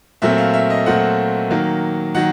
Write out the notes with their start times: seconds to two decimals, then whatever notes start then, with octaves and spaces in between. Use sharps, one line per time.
0.22 A#2 F#3 A3 C4 E5
0.38 F5
0.53 E5
0.70 D#5
0.86 A#2 F#3 A3 C4 F#5
1.50 D#3 F#3 A#3
2.15 D#3 F#3 F#5